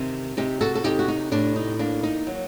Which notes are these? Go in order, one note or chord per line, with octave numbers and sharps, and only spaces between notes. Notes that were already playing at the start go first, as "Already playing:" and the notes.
Already playing: C3 D#3
C3 D#4 G4
F#4 A4
A4
C3 D#4 G4
F#4
D#4
A2 D4
D#4
A#3 D4
D#4
F#3